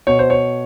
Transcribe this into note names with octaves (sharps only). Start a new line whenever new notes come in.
B2 C#5
C5
C#5